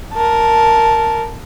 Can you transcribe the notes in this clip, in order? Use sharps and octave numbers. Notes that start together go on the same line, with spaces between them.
A#4 A5